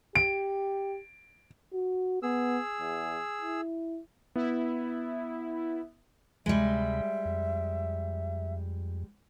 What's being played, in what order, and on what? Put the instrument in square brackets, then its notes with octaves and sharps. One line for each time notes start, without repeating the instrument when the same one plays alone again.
[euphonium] G4 [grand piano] D7
[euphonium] F#4
[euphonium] B3 [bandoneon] G#4 E6
[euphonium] E2
E4
[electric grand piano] B3 [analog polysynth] E4
[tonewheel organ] D2 C3 B5 [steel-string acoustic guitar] G3 G#3 [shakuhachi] E5
[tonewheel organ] F2